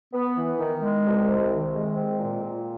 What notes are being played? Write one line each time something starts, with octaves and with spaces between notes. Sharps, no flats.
B3
E3
D#3
G#3
C2
C3
D#3
G#3
C4
A#2
A#2